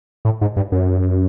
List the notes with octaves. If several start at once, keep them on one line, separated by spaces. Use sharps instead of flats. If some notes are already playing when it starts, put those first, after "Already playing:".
A2
G#2
G2
F#2